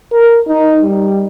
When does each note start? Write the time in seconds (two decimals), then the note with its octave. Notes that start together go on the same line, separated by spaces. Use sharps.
0.12 A#4
0.48 D#4
0.82 G3